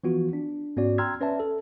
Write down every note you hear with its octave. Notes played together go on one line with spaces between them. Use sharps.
E3 F3 B3 F4 F#4
D4
G#2 B3 C#4 F#4 D5
G5 A#5 C6 E6 F6 G#6
C#4 B4 D5 E5 A5
A4